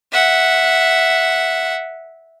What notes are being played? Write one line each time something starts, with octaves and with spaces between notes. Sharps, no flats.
E5 F#5